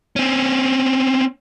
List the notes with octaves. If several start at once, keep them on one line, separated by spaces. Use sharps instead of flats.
C4 C#4